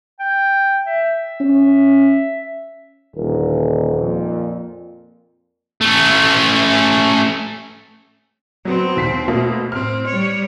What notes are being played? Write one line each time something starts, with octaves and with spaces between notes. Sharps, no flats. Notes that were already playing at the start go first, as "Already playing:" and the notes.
G5
E5
C#4
D#1 D3 A#4
F2 A#2
A3 C#4
F#3 B3 C4
D#2 B6 C7
B2 A3 A#3
A2 C4 F6
G3 C#5